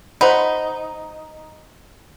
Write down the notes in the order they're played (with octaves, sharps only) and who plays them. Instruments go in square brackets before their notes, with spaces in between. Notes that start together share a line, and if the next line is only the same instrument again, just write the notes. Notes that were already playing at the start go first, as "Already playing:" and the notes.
[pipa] D#4 [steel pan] C5 F#5 B5